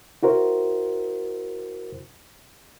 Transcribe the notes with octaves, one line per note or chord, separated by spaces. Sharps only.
E4 F#4 A#4 C5